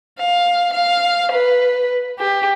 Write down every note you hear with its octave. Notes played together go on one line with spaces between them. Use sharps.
F5
F5
B4
G4